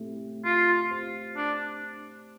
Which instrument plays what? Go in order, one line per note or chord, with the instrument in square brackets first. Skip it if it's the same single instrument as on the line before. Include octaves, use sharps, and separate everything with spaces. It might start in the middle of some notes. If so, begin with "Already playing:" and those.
Already playing: [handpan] A3 C4 E4 G4
[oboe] F4
[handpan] A3 C4 G4 C5
[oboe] D4